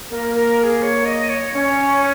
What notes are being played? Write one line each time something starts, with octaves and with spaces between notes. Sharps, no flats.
A#3 A#4
A#4
A#4
G#4
C#5
D#5
C#5
C#4 C#5